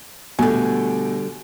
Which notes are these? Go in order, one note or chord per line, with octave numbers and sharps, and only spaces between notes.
B2 D3 G3 A3 G#5